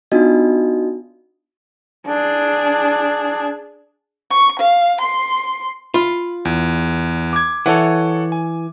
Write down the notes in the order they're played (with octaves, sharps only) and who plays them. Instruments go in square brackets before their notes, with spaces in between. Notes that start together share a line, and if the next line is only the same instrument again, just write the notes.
[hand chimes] B3 D4 D#4 F4 F#4 D#5
[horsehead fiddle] D4 G#4
[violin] C#6
F5
C6
[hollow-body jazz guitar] F4 [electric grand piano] B5
[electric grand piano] E2
D6 G#6
[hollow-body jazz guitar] E3 [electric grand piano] A4 C#5 F#5
[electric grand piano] G#5